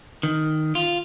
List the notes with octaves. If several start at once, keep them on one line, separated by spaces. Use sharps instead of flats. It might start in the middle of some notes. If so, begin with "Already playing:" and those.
D#3
F4